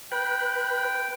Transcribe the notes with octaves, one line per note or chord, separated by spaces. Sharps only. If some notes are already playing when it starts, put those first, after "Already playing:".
B4 G5 B5 F#6